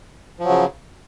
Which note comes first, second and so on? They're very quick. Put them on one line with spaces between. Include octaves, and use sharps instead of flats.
F3 F#3 C#3